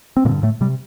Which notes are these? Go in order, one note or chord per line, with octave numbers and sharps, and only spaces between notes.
C4
G2 A#2 D3 A#3
A2 A3
C3 G3